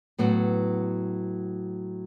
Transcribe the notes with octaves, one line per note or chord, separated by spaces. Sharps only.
A2 F#3 B3